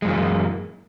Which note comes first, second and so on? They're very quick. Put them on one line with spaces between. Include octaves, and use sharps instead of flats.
G#3 F#2 E3 A#3